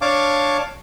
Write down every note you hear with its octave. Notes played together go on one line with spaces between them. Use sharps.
D4 C#5 F5 A5 D6